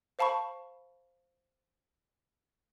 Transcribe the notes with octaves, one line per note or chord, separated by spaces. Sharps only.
C5 F5 A5 B5 C#6